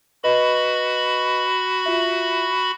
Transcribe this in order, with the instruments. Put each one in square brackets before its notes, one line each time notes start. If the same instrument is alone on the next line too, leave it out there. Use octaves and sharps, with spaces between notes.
[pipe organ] F#4 B5 [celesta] B4 D#5
[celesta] F4 E5